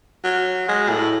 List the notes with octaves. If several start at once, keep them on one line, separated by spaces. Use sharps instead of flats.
F#3
G#3
A2